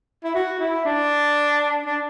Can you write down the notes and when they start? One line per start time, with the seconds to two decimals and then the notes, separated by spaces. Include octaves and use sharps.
0.24 E4
0.35 F#4
0.60 E4
0.85 D4
1.86 D4